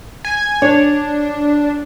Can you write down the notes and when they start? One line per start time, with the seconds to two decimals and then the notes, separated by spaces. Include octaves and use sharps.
0.25 G#5
0.62 D4 C#5